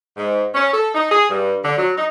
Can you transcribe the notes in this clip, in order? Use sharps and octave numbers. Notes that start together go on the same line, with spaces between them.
G#2
C#4
A4
D#4
G#4
G2
D3
F#3
D#4